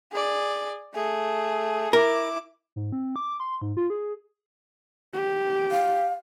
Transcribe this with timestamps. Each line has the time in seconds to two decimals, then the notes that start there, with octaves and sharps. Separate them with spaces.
0.12 G#4 D5
0.94 A3 G#4
1.93 E4 A#4 D6
2.76 G#2
2.92 C4
3.16 D6
3.40 C6
3.61 G#2
3.77 F4
3.90 G#4
5.13 G4
5.71 F5